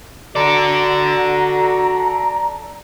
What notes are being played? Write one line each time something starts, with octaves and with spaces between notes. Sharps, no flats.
F#4 A4 D5 A#5